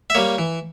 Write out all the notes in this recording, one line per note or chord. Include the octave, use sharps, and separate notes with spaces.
E5
G3 A#3 C#5
E3